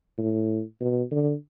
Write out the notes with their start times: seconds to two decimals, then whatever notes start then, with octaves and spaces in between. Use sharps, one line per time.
0.18 A2
0.80 B2
1.11 D3